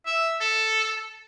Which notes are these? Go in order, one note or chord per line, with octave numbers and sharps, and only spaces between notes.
E5
A4